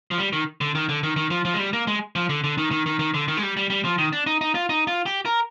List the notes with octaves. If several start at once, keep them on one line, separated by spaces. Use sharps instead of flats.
F3
G3
D#3
D3
D#3
D3
D#3
D#3
F3
F3
G#3
G3
A#3
G#3
F3
D3
D3
D#3
D#3
D#3
D#3
D3
D#3
G#3
G3
G3
G3
F3
D#3
D4
D#4
D#4
F4
D#4
F4
G4
A#4